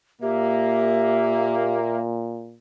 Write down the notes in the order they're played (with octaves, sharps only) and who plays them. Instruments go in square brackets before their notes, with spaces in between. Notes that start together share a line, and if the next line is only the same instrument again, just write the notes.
[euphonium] A#2 [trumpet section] A#3 [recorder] G4 [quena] E5